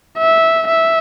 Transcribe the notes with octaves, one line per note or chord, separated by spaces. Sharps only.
E5
E5